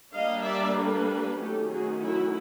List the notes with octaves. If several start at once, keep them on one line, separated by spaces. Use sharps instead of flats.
G3 A#3 D4 D#5 F5
D5 E5
A4 B4
D#3 F#3 A3 C#4 G4 A4
F#4 G#4
E4 F#4